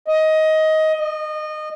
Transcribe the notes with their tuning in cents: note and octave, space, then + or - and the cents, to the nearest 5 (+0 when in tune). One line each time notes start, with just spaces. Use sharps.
D#5 +15
D#5 -25